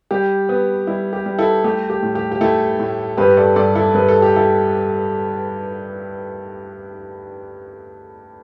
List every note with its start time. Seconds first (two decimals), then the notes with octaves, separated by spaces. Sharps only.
0.11 G3 G4
0.49 B3
0.87 G3 E4
1.13 G4
1.26 G3
1.39 E4 A4
1.64 A3 G4
1.90 G4
2.03 A2
2.15 G4
2.32 G4
2.41 A3 E4 A4
2.79 A2
3.17 G2 G4 B4
3.37 A4 D5
3.56 G2 A4 D5
3.75 E4 A4
3.95 G2 B4
4.08 A4
4.22 G4
4.36 E4 A4